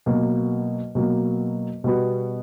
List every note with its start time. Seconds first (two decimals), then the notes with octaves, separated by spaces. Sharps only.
0.06 B2 F#3 A#3
0.95 B2 F#3 A#3
1.84 B2 G3 B3 F#4